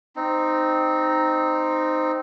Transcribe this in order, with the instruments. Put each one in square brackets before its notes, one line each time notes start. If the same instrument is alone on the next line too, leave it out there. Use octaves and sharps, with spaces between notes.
[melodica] C4 D#4